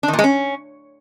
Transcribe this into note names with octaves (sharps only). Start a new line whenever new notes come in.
D4
D#3
A#2
G#3
C#4